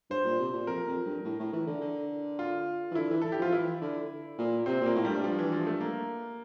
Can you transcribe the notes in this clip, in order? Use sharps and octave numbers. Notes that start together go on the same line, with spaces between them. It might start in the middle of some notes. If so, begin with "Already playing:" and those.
G2 C5
A#2
C3
A#2
F2 A#4
F2
G2
A2
A2
E3
D3
D3
F4
E3
D3 E4
E3
A4
G4
F3 F4
E3 E4
D3
A#2
C3 C4
A#2
A#3
A2
G2 G3
F3
E3
F3
A3
A#3